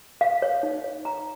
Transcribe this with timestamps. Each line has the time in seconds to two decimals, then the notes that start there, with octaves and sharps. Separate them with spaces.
0.21 F5
0.42 C#5
0.63 D#4
0.84 C#5
1.05 A#5